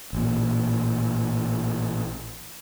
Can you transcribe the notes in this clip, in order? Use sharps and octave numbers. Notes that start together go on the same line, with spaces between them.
A1 A#2